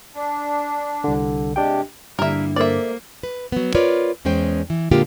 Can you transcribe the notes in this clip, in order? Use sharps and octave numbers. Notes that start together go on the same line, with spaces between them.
D4
C2 D3
C3 G#3 D4 G4 G5
G2 D3 G3 A#3 E4 A#4 E5
A#3 A4 A#4 C5 D5 E5
B4
F#3 B3
F4 A#4 B4 C#5 D5
E2 G#3 C#4 C5 G5
E3
A#2 D3 G#3 A#3 F4 G4